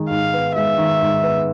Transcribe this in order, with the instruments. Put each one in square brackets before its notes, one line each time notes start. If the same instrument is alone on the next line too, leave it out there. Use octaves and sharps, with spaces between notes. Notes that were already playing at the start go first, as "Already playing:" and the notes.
Already playing: [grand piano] D#3 G#3
[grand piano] G#2 [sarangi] F5
[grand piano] B3
[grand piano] G#3 [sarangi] E5
[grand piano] D#3
G#2
B3